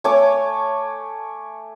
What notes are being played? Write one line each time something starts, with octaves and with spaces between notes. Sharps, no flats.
A3 C#5 G#5 D6